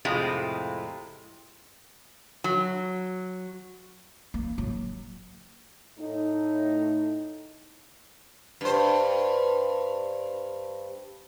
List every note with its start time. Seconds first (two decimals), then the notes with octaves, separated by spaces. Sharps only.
0.05 F2 A2 C3 G#3 E4 F4
2.44 F#3
4.34 A#3
4.58 F#3
5.98 A2 D#4
8.61 G2 C5